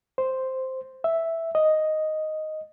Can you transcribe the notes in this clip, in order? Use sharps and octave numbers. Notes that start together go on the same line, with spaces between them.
C5
E5
D#5